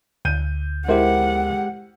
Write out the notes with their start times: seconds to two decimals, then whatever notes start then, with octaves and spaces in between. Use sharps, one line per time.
0.25 D2 G6 D#7
0.88 G#3 E4 G4 A#4 C5 F#5